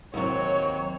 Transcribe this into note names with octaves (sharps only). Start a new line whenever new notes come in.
D#2 C3 F#3 C#5